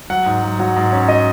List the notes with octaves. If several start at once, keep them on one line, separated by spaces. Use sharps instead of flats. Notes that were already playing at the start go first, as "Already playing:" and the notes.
F#3 F#5
G#2
F#3
F#3
G#2
C#4
F#3 D#5